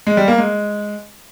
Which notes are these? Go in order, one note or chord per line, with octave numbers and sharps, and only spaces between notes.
G#3
G3
A#3
G#3